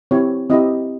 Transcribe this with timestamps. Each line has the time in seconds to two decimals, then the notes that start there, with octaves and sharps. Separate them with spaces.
0.11 C4 E4 G4 C#5
0.50 C4 E4 G4 D#5